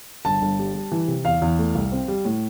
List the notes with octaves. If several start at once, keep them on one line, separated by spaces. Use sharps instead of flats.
G1 A5
G1
G3
G3
E3
C3
E2 F5
E2
A3
C2
C4
G3
A2